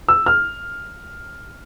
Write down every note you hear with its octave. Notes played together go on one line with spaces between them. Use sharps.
E6
F6